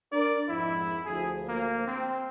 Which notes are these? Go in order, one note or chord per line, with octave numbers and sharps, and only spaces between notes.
D4 A#4 D5
F2 G#2 E4
D2 F3 G#4
A#3
C4